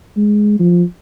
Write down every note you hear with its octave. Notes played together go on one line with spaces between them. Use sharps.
G#3
F3